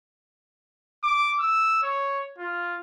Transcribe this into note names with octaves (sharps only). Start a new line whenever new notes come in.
D6
E6
C#5
F4